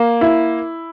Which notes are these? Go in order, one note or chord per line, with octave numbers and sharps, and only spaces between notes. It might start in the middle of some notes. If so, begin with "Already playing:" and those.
Already playing: A#3
E4